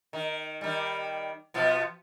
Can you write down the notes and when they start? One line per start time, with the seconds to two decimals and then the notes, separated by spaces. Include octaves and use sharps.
0.13 D#3
0.61 D#3 G3
1.54 B2 F3 B3